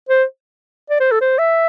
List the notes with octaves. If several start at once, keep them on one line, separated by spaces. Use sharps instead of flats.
C5
D5
C5
A4
C5
E5